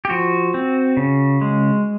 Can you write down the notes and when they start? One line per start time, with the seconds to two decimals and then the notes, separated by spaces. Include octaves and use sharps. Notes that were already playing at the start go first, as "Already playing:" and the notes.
0.05 G4
0.10 F3 F#4
0.54 C4
0.97 C#3
1.41 G#3